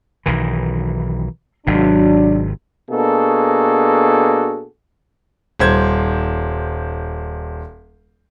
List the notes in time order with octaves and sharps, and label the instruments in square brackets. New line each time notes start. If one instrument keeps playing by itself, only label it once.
[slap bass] B1 D#3 E3
[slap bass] G#1 C3 [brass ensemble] F#3 D4
[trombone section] B2 A#3 D4 F#4 G#4 A4
[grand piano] D#1 C5 G#6